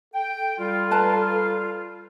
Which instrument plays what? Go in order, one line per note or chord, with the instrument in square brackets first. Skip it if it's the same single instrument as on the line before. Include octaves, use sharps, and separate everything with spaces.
[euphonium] A4 [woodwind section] G5
[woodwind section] G3 F4 [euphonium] A4
[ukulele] B4 A5 A#5